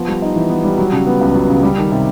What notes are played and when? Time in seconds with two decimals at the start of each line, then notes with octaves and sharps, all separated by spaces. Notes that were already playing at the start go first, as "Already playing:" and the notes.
Already playing: F3 B3
0.08 G3
0.22 D#4
0.35 E3
0.49 B3
0.64 G3
0.78 F#3
0.92 C#3
1.07 B3
1.21 C#2
1.34 F#3
1.49 C#3
1.63 G3
1.78 D#3
1.92 C3